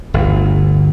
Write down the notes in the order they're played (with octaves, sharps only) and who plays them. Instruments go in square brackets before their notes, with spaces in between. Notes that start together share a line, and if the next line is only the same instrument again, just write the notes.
[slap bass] G1 D2